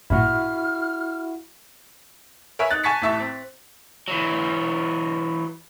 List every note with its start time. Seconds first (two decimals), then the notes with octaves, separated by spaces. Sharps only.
0.10 A1 G2 A#2 E4 F#4 F6
2.59 A#4 B4 C#5 E5 G#5
2.71 D#4 F#6 A6
2.84 G#5 A5 C#6 A6 B6 C#7
3.02 A1 A2 E5 A5 C#6 B6
3.20 C4
4.08 E3 F#3